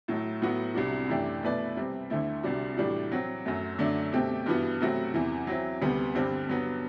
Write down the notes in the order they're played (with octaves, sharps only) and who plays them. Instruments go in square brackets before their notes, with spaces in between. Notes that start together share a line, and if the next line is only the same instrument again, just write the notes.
[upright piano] A2 F#3 A3
A2 F#3 B3 F#4
C2 C3 G3 D4 F#4
F#2 E3 A3 D4 G4
B2 A3 E4 B4 D5
C3 G3 C4
D2 D3 A3 E4
C2 C3 G3 D4 F#4
A2 E3 G3 D4 F#4
F#3 C4 F#4
F#2 F#3 A3
F#2 D3 F#3 A3 D4
B2 A3 C4 G4
G2 E3 B3 F#4
C3 F#3 A3 C4 F#4
E2 C3 E3
F#3 C4 E4
D2 C3 G3 B3
G2 D3 G3 C4
G2 F#3 B3